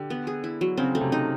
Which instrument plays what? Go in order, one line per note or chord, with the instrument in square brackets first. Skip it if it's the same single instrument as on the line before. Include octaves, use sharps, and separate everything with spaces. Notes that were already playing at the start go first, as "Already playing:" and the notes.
Already playing: [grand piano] D3 [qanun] G4
[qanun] B3
G#4
E4
F#3
[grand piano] C#3 [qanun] C4
[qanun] A3
[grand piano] C3
[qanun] D#4